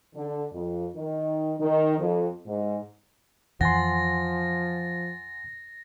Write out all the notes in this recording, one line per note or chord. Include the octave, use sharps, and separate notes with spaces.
D3
F2
D#3
D#3
F2
G#2
F2 E3 F3 F#5 G#5 C6 A6 A#6